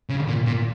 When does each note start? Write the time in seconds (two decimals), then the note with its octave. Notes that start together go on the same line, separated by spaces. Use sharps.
0.09 C#3
0.27 A#2
0.46 A#2